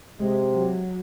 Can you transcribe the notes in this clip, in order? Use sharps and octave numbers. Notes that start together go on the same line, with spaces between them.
C3 G#3
F#3